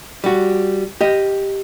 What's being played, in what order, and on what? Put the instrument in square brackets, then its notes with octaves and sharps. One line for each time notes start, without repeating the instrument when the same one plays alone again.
[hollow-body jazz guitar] G3 F#4
G4 D#5